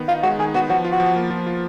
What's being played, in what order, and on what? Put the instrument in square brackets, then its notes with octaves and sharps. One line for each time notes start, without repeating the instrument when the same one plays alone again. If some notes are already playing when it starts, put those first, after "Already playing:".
Already playing: [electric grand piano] D#3 B3
[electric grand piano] D#4 [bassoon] F4
[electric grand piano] G#3 [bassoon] F#4
[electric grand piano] D#3 [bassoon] G#4
[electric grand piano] B3 [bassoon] F#4
[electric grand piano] F3 [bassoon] F#4
[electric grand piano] F4
[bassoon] F#4
[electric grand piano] F3
A#3
F3
F4